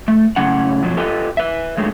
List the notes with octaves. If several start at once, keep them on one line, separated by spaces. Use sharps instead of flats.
A3
A2 C#3 F#3 C#4 F#5
F2 B2 F3 F#3
F4 G4 A4 B4 D#5 G5
B4 E5
G2 D#3 F#3 G#3 A3